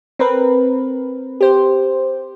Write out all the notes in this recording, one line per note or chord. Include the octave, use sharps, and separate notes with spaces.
C4 A#4 B4
G4 C5